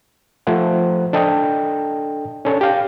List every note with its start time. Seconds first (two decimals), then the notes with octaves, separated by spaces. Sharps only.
0.47 F3 A3 C5 F#5
1.13 D4 A4 D#5 G5
2.45 C#4 D4 A4 C#5
2.61 G4 F5 G5